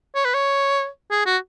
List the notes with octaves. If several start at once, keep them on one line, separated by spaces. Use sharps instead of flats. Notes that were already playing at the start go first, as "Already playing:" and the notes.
C#5
B4
C#5
G#4
F#4